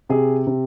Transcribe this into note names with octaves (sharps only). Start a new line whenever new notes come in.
C3 G#4
C3